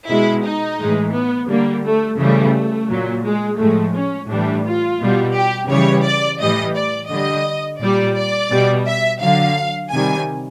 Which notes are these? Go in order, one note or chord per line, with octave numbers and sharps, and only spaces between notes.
B2 G#3 E4
D#4
A2 E3 G#3
B3
D3 G3 A#3
A3
C#3 E3 G3 A3
A#2 F#3
G#3
A2 F3 G#3 A3
C#4
A2 E3 G3 D4
F4
B2 G3
G4
C#3 E3 G3 C#5
D5
A2 E3 G3 D#5
D5
D3 G3 D#5
A#2 G3 D5
D5
B2 G3
E5
D3 F#3 F5
C3 D#3 G3 G#5